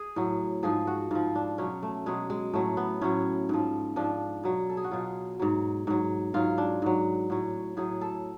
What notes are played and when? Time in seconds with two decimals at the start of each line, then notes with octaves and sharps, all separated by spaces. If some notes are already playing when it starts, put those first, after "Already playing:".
Already playing: G#4
0.16 A2 F#3
0.63 G#2 F3 G#4
0.87 F#4
1.11 G#2 F3 F4
1.35 D4
1.58 B2 F#3 C#4
1.83 A3
2.06 B2 F#3 G#3
2.30 G#3
2.53 A2 F#3 A3
2.77 B3
3.01 A2 F#3 C#4
3.49 G#2 F3
3.96 G#2 F3 D4
4.44 B2 F#3
4.70 A4
4.77 G#4
4.84 F#4
4.91 B2 F#3 F4
5.39 G#2 F#3
5.87 G#2 F#3
6.34 G#2 F#3 F4
6.58 D4
6.82 G#2 F#3
7.30 A2 F#3
7.77 A2 F#3 G#4
8.01 A4